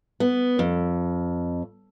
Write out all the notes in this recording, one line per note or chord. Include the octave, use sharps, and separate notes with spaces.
B3
F2